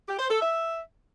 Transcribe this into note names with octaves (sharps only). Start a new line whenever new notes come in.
G4
C5
A4
E5